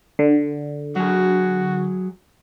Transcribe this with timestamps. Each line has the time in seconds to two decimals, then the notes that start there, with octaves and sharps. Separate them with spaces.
0.19 D3
0.96 F#3 F#4 G#4